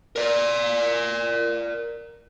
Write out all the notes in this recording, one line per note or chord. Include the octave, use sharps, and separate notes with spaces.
A#4 D5